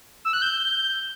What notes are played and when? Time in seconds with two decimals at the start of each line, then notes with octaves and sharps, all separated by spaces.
0.25 E6
0.33 F#6
0.42 G6